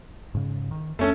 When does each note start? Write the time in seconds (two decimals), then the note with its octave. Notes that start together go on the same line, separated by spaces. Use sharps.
0.35 G#2 C#3
0.71 D#3
0.99 F2 A3 C#4 D4 A4